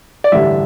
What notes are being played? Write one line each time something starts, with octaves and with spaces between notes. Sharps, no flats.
D5
A1 G2 D3 G3 E5